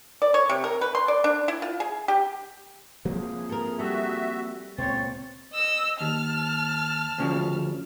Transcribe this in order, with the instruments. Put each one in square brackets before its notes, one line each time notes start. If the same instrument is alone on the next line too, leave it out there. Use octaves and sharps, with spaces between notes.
[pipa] D5
C#5
C3
A#4
B4
C6
D5
D4
E4
F4
G#4
G4
[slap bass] F3 A#3 C4 [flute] G#4
[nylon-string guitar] A4 A#4
[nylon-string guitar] G3 A4 [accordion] F#4 E5
[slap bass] C#2 A#2 B3 [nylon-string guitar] C4 [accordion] C#5 [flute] A6
[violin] D#5 E6
[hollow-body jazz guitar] D#2 [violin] A5 F6
[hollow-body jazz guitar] D2 C#3 F3